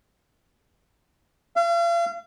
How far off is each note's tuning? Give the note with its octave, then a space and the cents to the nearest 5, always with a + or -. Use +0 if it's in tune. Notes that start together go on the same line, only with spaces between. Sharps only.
F5 -40